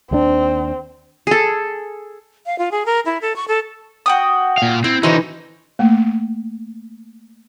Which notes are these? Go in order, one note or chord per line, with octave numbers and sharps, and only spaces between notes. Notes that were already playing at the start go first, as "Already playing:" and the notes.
D#2 G#3 C4 D4
G#4 A4
F5
F4
G#4
A#4
E4
A4
C#6
A4
F#4 G5 D#6
A#2 F5
C4 E4
D3 E3 D#4 F#4 C5
A3 A#3